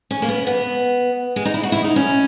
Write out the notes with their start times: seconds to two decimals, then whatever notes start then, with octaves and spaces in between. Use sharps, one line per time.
0.11 C#4
0.22 A#3
0.28 B3
0.47 B3
1.36 G#3
1.45 D#4
1.54 E4
1.63 F#4
1.72 E4
1.84 D#4
1.96 C#4